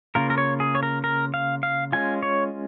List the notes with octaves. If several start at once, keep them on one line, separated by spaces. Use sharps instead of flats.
C#3 A#3 F4 A#4
A#4
C#5
G#4
C#5
A#4
A#4
F5
F5
G#3 C#4 F4 G#5
C#5